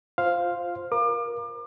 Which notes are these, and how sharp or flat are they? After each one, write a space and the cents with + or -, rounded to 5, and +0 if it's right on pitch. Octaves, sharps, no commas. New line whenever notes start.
F4 +0 C5 +0 F5 +0
A#4 +20 D6 +35